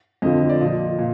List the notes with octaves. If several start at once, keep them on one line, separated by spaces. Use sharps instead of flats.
F2 D3 F3 D#5
D5
A#2 F3 D#5
A#2